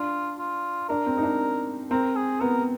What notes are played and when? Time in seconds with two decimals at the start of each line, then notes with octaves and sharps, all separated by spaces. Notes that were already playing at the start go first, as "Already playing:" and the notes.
Already playing: D4 F4
0.39 F4
0.89 D4 A#4
1.06 C4
1.17 D#4
1.23 D4
1.91 C4 A#4
2.16 G#4
2.41 B3 A#4